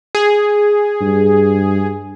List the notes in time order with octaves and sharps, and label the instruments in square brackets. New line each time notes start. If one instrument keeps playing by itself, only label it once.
[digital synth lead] G#4
[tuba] G2